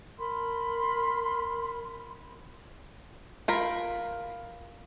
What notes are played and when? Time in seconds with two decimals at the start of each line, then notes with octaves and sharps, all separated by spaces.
0.17 A#4 B5 C6
3.48 F4 A#4 B5